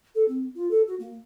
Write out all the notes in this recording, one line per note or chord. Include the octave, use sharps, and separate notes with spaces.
A4
C4
F4
A4
F#4
A#3